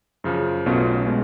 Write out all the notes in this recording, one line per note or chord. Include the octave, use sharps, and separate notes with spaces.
F#2 C#3 F3
B1 B2 A3 C#4 F4
B2 G#3 C#4